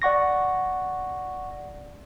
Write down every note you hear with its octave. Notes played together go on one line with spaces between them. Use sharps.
D5 F#5 C#6 A#6